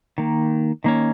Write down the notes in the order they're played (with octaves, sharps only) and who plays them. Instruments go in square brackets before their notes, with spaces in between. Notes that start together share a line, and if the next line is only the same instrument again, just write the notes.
[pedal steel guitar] D#3 A#3
D#3 A#3 C#4